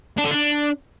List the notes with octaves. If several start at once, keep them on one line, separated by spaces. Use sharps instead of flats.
D4
D3
D4